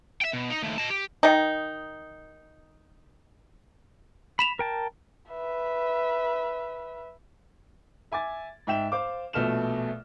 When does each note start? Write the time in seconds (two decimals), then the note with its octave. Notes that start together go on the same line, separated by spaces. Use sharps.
0.21 E5 G5
0.33 B2
0.50 D#4
0.63 D#2 A3
0.78 D#5 A5
0.90 G4
1.23 D#3 D#4
4.39 B5 B6 E7 F7
4.59 A#4 G5 A5
5.30 B4 E5
8.12 E5 G#5 D6 A6
8.67 G#2 E5 G5 E7
8.92 C5 F5 D6
9.33 A#1 B2 A3 F6 E7